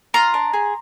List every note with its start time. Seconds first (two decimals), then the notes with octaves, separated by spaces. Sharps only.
0.14 F4 A#5 C6
0.34 D4
0.53 G#4